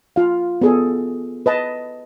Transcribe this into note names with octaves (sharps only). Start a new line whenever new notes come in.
F4 F5
B3 G#4 A4
B4 D#5 A5